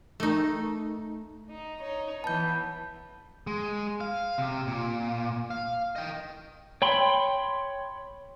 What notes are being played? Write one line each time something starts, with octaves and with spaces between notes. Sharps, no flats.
A3 D#4
D#4
D#4 C#5
E3 B3 A5 G6
G#3
F5
C3
A#2
F5
D#5 G5
C#5 G5 B5 C6